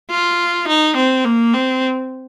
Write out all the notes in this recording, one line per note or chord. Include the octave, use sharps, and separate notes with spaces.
F4
D#4
C4
A#3
C4